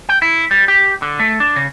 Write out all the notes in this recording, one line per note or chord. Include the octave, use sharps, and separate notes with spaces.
G5
E4
G3
G4
D3
A3
D4
C#3